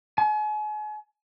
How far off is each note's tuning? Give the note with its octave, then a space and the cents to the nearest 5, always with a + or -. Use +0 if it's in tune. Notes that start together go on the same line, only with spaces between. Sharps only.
G#5 +40